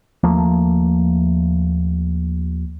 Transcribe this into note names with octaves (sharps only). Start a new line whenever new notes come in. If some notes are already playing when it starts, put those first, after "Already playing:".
D#2 F3 A3 A#3